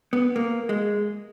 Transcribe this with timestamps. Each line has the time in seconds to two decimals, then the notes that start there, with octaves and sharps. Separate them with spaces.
0.13 B3
0.36 A#3
0.69 G#3